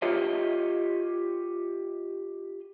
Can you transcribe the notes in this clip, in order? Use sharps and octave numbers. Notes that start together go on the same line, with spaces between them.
F4 G4 C#5 D#5 E5